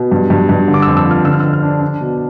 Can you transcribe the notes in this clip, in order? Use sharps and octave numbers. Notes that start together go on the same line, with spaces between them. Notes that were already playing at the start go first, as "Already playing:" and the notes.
Already playing: B2
G2
G2
G2
D3
D6
F2 E6
E6
F3
F6
D3 E6
F6
D3 E6
F6
D4
D4
B2